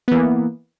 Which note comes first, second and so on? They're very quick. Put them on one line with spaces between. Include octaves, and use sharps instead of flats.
B3 E3 A#3